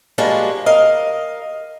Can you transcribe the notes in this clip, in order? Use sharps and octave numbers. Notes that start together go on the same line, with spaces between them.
F3 G3 G#3 A#3 D4 F#4
A#4 D#5 F5